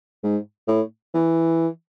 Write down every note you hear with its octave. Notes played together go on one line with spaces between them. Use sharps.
G#2
A2
E3